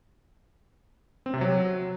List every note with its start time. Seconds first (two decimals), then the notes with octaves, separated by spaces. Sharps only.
1.26 C4
1.34 C3
1.41 F#3